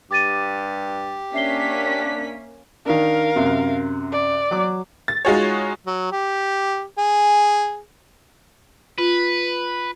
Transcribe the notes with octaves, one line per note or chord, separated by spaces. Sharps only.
G2 G4 D6 A6 D#7
A#3 C#4 D4 E5 B6 C7 G7
D#3 D4 A#4 F5
F#2 C3
D5
F#3 D6
A6
G#3 D#4 F4 F#4 G#4 C#5
F#3
G4
G#4
F4 B4